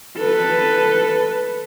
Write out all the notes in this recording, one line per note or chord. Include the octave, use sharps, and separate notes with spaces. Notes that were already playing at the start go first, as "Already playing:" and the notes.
A4 B4